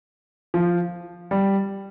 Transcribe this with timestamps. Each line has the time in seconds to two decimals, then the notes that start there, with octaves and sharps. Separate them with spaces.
0.54 F3
1.31 G3